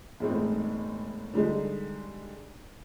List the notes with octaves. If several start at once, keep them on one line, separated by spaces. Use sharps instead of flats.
E1 A2 G#3 C4 D#4
D3 G3 G#3 D#4